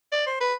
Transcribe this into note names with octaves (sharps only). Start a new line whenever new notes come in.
D5
C5
B4